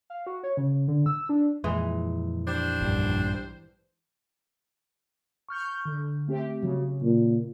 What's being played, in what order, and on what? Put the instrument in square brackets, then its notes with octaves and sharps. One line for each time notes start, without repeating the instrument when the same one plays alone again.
[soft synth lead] F5
F#4
C#5
C#3
D3
E6
D4
[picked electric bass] F2 A#2 [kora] E3 G#3
[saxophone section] G3 D4 C5
[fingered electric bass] A#1 G2
[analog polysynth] C#6 F6 G6
D3
A3 C4 G4
[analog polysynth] C#3 [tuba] F#3
[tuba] A#2